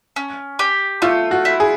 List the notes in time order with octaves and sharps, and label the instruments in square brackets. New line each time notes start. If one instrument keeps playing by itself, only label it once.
[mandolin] C#4
G4
[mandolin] A3 [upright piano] F4
[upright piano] F#4
[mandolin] E4
[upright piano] G#4